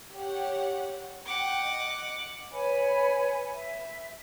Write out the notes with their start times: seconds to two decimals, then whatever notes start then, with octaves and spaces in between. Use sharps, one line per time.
0.15 G4 C#5 F#5
1.26 F#5 G5 D6
1.66 D#5
2.52 B4 C#5 G#5 B5
3.53 E5